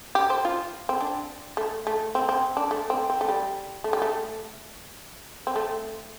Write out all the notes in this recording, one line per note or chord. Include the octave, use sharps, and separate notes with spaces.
G4
C5
F4
C4
D4
A3
A3
C4
C4
D4
A3
C4
C4
A3
G3
A3
G3
A3
C4
A3